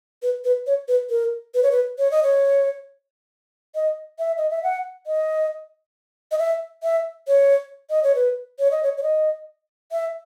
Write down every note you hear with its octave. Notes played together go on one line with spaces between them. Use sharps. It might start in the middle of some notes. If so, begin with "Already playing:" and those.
B4
B4
C#5
B4
A#4
B4
C#5
B4
C#5
D#5
C#5
D#5
E5
D#5
E5
F#5
D#5
D#5
E5
E5
C#5
D#5
C#5
B4
C#5
D#5
C#5
C#5
D#5
E5